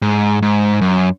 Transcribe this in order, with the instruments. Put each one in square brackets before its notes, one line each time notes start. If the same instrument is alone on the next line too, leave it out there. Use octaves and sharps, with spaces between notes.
[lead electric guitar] G#2
G#2
F#2